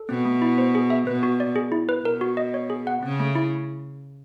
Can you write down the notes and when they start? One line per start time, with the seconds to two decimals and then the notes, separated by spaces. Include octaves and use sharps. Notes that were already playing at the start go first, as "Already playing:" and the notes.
Already playing: A4
0.09 B2 C4
0.25 A3
0.42 E4
0.58 C5
0.75 G#4
0.90 E5
1.07 B2 B4
1.23 F#4
1.40 D5
1.56 G#4
1.72 E4
1.89 B4
2.05 B2 A#4
2.21 F#4
2.37 D#5
2.54 C#5
2.70 G#4
2.87 F#5
3.03 C#3 C4
3.20 A3
3.35 E4